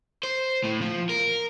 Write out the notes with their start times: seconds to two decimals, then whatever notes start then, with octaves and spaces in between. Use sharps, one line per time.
0.24 C5
0.64 A2
0.81 F3
1.09 A#4